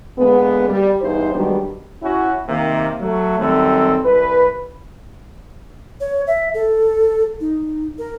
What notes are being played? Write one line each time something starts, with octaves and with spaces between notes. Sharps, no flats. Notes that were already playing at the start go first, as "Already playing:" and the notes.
D3 G#3 A#3 B3
G3
E2 G2 D#4 C5
G#2 D#3 F#3 G3 B3 D4
C#4 E4 F#4
C3 D#3 A#3
F#3 A3
F#2 D#3 G3 C4 A4
C2 B4
C#5
E5
A4
D#4
A#4